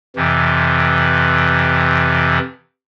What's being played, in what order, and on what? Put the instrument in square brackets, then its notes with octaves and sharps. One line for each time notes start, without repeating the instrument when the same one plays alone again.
[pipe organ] F2 C3 E3